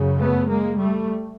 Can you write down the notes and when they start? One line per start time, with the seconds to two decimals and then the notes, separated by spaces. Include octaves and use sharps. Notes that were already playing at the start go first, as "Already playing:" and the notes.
Already playing: F#2 C#3
0.19 A3 B3
0.49 G#3 A#3
0.79 G3 A3